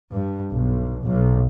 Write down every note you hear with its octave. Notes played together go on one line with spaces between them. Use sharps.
G2
B1
B1